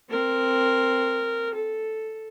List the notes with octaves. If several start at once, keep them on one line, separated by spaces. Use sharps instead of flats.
C4 A#4
A4